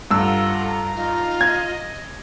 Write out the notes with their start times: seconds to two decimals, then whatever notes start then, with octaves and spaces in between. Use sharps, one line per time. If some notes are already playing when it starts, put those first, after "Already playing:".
0.11 G2 F4 A4 F#5 A#5 E6
0.95 D#4 F4
1.41 D#5 G#6